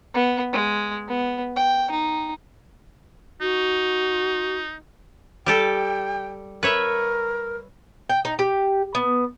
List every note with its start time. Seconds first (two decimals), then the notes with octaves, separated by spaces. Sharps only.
0.14 B3
0.53 G#3
1.09 B3
1.56 G5
1.91 D#4
3.41 D#4 F#4
5.46 G3 G4 A4 G5
6.63 A#4 B4 C#5 E5
8.10 G5
8.25 D#4
8.39 G4
8.95 B3